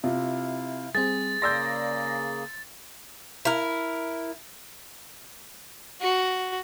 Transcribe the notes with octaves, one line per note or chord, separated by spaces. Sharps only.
C3 E4 F4 F5
G3 C4 G#4 A6
C#3 A#3 G#4 D5 C6 E6 G6 A#6
E4 A#4
F#4